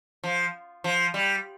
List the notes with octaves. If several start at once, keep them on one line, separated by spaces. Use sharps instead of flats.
F3
F3
G3